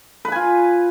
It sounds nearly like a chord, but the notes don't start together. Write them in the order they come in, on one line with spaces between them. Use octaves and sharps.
B4 B5 G#5 F4